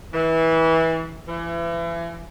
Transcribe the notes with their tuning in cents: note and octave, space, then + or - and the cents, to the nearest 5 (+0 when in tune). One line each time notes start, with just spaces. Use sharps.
E3 -20
E3 +35